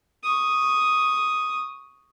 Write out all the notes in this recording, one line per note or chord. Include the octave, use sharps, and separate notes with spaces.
C#6 D#6